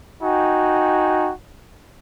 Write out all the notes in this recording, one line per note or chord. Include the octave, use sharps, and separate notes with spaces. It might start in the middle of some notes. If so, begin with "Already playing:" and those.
D#4 F#4 G5 G#5